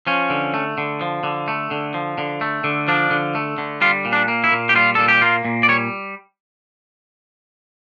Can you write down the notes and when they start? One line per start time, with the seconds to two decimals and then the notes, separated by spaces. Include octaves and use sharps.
0.07 F3 C#4
0.30 D3
0.54 A3
0.78 D3
1.01 F3
1.24 D3
1.48 A3
1.71 D3
1.94 F3
2.18 D3
2.41 A3
2.64 D3
2.88 F3 D4
3.11 D3
3.35 A3
3.58 D3
3.81 G3 F4
4.05 A#2
4.13 D4
4.28 A#3
4.44 E4
4.52 A#2
4.69 G4
4.75 G3 F4
4.95 A#2 A4
5.08 G4
5.22 A#3 F4
5.45 A#2
5.63 D5
5.68 G3 C#5